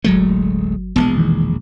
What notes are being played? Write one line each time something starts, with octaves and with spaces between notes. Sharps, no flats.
D1 G1 F#3 G#3 A3
E1 A#1 G#3 B3 A5
D#3 E3